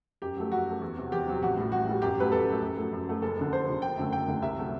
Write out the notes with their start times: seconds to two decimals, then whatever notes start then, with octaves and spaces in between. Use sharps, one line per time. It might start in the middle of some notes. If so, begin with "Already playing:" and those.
0.22 F#2 G4
0.36 F#3 A3
0.52 F#2 F#4
0.67 F#3 A3
0.81 E2
0.97 C3 F#3
1.12 E2 G4
1.27 C3 F#3
1.42 A1 F#4
1.57 A2 G3
1.72 A1 F#4
1.87 A2 G3
2.02 F#2 G4
2.17 F#3 A3 B4
2.32 F#2 A4
2.47 F#3 A3
2.62 F#2
2.77 F#3 A3
2.92 F#2
3.07 F#3 A3
3.22 F#1 A4
3.37 F#2 D3
3.52 F#1 C5
3.67 F#2 D3
3.82 F#1 G5
3.98 F#2 D3 A3
4.13 F#1 G5
4.27 F#2 D3 A3
4.42 C2 E5
4.58 C3 F#3 A3